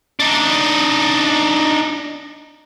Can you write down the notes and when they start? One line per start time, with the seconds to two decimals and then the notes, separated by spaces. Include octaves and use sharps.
0.20 D4 D#4